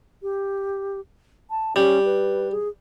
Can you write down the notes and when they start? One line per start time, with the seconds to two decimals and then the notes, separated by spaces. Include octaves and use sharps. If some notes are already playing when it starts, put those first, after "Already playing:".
0.22 G4
1.50 A5
1.76 G3 C#4
2.05 B4
2.52 G#4